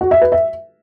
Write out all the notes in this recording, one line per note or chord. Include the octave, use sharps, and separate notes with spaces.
F#4
E5
B4
E5